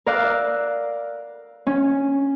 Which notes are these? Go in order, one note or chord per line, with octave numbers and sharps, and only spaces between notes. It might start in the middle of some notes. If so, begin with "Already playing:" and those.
A#4 D5 F5 E6 F#6
C#4